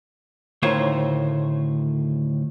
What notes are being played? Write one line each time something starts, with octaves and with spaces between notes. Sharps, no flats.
D2 A2 D#3 F4 C5 C#5